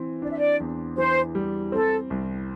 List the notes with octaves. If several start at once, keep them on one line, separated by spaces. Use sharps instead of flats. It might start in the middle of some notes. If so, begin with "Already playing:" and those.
Already playing: E3 C4
D4 D5
E5
D5
E2
E3 C5
G3
C4 A4
C2